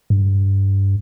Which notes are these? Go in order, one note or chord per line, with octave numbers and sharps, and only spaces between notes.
G2